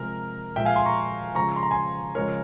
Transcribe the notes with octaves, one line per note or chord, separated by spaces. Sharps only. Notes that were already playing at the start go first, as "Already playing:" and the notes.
Already playing: C3 F3 G#3 A#4
A#2 F3 G#3 E5 G5
F5 G#5
G#5 C6
A#5 C#6
C#3 F3 G#3 A#5 C#6
C6
A#5
G#5 C6
C#3 F3 G#3 A#4 C#5